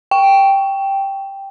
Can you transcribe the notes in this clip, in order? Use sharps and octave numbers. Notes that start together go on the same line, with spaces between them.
G5